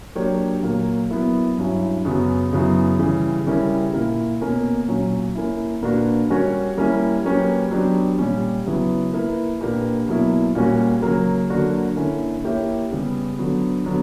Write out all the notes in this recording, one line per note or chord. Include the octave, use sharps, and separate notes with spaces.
F#3 A#3 D4 G4 C#5
A#2 F#3 A#3
F#3 B3 E4 A#4
G2 F#3 C#4 E4
F#2 C#3 F#3 B3
F#2 C#3 F#3 B3 E4
C#3 E3 G3
C#3 G3 C#4 E4 A#4
A#2 A#3 E4 A#4
B2 A#3 C#4
A#2 F#3 C#4
A#3 C#4 E4
A#2 A#3 D4 F#4 B4
G3 C#4 F#4 A#4 C#5
G3 A#3 C#4 E4
F#3 A#3 C#4 G4 B4
F#3 B3 D4 G4
A#2 G3 C#4
C#3 F#3 B3 E4 B4
A#3 E4 B4
A#2 A#3 D4 G4 B4
B2 F#3 A#3 E4
A#2 G3 A#3 C#4 F#4
C#3 F#3 A#3
D3 F#3 A#3 D4 F#4
D3 A#3 C#4 E4
A#3 E4 G4 C#5 E5
C#3 G3 B3
D3 F#3 B3
D3 F#3 B3